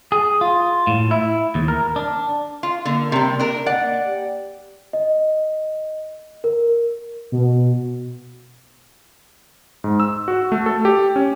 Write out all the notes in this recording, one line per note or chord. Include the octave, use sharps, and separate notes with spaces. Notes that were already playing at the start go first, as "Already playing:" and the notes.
G#4
F4
A2
E4
D#2
A#4
D4
F4 F5
D3 A#3
C3 G3
D4 A#4
D5 F#5
G4
D#5
A#4
B2
G#2
E6
F#4
A3
A4
G4
C#4